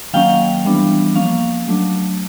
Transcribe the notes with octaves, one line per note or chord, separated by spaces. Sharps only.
D#3 F#3 A#3 C#4 F5 G5
E3 G3 B3 D4
F3 A#3 C#4 F5
F#3 A3 D4